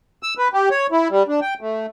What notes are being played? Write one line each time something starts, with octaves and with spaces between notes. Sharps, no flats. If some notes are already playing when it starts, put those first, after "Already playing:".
E6
B4
G4
C#5
E4
G3
D4
G5
A3